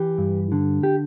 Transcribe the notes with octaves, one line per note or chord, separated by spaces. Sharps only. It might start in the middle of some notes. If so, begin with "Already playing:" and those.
Already playing: E3 G4
G2
D3
G4